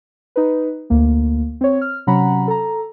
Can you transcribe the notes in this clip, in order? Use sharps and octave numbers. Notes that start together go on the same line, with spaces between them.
D#4 B4
D2 A#3
C4 C#5
F6
C3 F#3 C#4 F#5 A#5 B5
A4 A#5